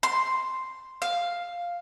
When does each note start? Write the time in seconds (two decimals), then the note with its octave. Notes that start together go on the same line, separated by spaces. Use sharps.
0.03 C6
1.02 F5